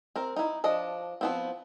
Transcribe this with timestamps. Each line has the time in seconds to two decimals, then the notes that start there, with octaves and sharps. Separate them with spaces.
0.16 C4 A#4
0.36 D#4 E4
0.64 F3 D4 D#5
1.21 F3 B3 C4